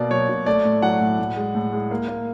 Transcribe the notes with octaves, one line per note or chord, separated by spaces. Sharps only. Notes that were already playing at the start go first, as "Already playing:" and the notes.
Already playing: B2 A#3 D5
F#3 C#5
B2
A3 D5
A2
F#3 F#5
A2
A2
G#3
A2
G#3
A#3
A#3